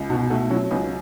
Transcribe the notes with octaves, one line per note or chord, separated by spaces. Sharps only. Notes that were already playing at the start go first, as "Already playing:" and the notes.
Already playing: C#2
B2 D#4 F#4
A3 D#4 F#4
F#3 C#4 E4
C#2 B3 D#4